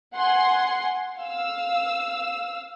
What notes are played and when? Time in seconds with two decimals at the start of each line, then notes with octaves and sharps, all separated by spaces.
0.15 F#5 G#5 C6
1.20 F5 E6